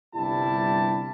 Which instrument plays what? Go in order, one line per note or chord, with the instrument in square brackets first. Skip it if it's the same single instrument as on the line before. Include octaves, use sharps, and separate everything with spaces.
[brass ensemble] G1 C2 G2 G3 E4 A5